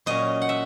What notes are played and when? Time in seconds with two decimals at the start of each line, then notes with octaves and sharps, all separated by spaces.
0.06 A#2 F#3 C#4 D#5
0.42 F#5
0.49 E5